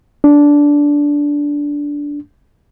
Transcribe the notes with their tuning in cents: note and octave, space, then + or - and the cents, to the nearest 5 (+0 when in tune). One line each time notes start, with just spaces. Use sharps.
D4 -10